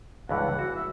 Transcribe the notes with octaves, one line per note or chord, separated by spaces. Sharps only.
C#2 G2 E3 F#5
F#4
E5